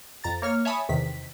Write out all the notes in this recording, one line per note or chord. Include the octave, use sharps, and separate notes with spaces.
F2 A#5 A6
A#3 C#5 F6
C#5 E5 G#5 A5 B5 D#6
E2 C3 D#3 B6